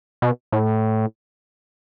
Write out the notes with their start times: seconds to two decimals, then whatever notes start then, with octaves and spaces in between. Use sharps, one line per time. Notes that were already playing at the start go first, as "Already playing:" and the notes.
0.22 B2
0.52 A2